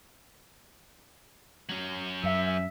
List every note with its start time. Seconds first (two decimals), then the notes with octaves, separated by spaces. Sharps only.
1.69 F#3 C#4
2.24 F#2 E5